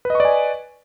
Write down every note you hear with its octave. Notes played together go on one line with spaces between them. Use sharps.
B4 D5 D#5 G#5 C#6